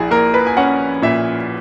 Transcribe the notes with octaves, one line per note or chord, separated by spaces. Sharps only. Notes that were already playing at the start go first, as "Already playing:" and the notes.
Already playing: A#1 E4 G#4
A#3 A#4
B4
G#5
C#4 F#5
A#2 E5